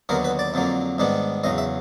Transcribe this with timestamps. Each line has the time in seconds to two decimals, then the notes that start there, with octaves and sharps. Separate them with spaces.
0.09 D#2 D3 F#3 B3 A#4
0.24 B4
0.39 D5
0.54 F2 D3 F#3 A#3
0.98 G#2 D#3 G3 B3 D4
1.44 E2 C#3 F#3 D#5
1.58 E5